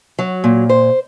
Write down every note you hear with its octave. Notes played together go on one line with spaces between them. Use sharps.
F#3
A#2
C5